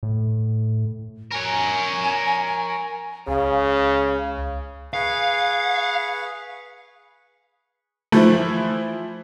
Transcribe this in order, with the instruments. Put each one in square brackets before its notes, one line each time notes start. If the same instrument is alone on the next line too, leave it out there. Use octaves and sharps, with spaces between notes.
[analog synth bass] A2
[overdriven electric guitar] A#4 C#5 [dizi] G#5
[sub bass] C#2 [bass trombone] C#3 [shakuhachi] F5
[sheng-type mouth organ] G#4 B4 C#6 [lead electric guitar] F5
[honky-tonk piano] E3 F3 E4 [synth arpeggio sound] A3